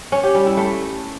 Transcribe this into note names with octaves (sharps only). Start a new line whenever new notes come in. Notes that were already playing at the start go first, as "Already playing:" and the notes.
C#4
G4
G3
E4
A3